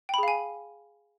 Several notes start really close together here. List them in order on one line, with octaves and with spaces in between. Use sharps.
G5 B5 G#4 F5 G#5